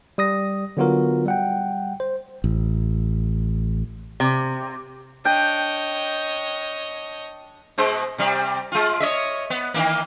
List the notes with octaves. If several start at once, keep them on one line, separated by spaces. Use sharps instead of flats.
G3 D#6 A#6
D3 F#3 B3 F4 F#4 A#4
G3 F#5 G5
C5
A1
C3
D4 C#5 D#5 G5
B2 G#3 C5
C3 G3
G#3 F4
C#5 D#5 E5
B3
D#3 E3 A#3